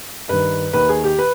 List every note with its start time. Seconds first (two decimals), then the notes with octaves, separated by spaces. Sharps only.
0.28 G2 D#3 B4
0.73 D#2 D#3 B4
0.89 G#4
1.04 G4
1.19 B4